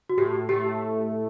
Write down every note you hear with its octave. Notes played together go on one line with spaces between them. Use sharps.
F#4
A2 G4
A3 G4